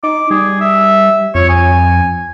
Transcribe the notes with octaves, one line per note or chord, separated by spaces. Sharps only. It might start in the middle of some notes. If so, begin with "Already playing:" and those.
D#4 D6
G3 G#4
E5
F2 C#5
G#5